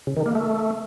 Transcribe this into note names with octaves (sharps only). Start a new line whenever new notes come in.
C#3
D#3
A#3
A3